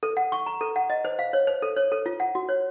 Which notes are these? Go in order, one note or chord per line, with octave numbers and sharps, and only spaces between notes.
A4
F#5
C#6
A#5
A4
F#5
D#5
C5
F5
C#5
C5
A4
C#5
A4
F4
F#5
F#4
C#5